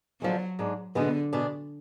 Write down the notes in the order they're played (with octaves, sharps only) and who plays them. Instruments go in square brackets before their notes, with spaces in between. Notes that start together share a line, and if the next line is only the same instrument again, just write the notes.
[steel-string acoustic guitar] D3 F3 G#3 [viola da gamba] F#3
[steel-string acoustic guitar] G#2 G#3 D4
[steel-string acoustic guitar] B2 G#3 B3 [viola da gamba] D3
[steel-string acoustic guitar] B2 G#3 D4 G#4